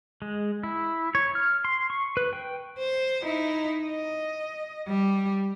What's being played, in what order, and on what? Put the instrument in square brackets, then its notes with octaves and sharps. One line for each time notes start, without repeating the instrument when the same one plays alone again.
[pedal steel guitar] G#3
E4
C#5
F6
C6
C#6
B4
G5
[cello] C5
D#4 E4
D#5
G3